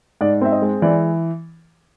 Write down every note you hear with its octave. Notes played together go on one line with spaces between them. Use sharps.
G#2 D5
C4 E5
D#5
G#3
E3 D5